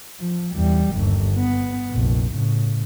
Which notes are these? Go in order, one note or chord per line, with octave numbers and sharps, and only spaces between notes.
F3
E2 G3
G1 D#2
B3
F1 A#1
A2 C#3